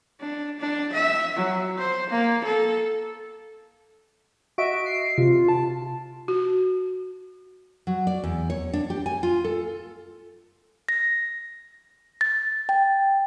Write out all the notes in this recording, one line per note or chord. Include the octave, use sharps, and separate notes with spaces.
D4
D4
E5
F#3
C5
A#3
A4
F#4 D#5 E5 D7
C7
C3 F4
A5
F#4
F#3
D5
E2
C#5
D4
G4
G#5
F4
A4
A#6
A6
G5